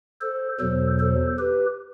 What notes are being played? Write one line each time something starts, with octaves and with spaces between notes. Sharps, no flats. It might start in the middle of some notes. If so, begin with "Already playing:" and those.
A4 C5
E2 B2 F#3 A4 C5
A4 C5
G4 B4